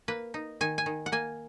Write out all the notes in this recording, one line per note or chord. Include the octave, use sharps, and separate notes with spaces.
A#3 B4
D#4
D#3 G#5
G#5
D#3
F#5
A#3 G#5